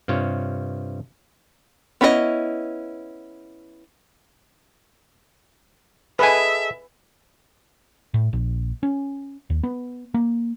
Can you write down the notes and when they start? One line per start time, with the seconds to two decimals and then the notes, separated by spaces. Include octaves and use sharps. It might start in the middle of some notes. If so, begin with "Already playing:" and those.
0.08 G2 C3 F4 C#5
2.01 B3 C#4 E4 G#4 D#5
6.19 G#4 A4 B4 D#5 E5 G#5
8.14 A2
8.33 A#1
8.83 C#4
9.50 D#2
9.63 B3
10.14 A#3